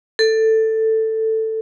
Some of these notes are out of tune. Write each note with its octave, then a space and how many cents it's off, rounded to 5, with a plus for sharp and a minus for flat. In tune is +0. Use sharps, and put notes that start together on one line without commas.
A4 +10